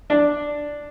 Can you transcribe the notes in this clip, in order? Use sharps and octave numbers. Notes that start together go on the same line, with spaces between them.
D4